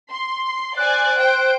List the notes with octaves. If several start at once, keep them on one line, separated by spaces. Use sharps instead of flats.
C6
C5 D5 G#5 F#6
C5 G5 D7